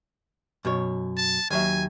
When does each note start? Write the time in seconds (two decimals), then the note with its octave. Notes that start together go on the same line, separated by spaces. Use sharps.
0.65 F#2 B2 C#5
1.17 A5
1.50 D#2 F#3 E5 G#5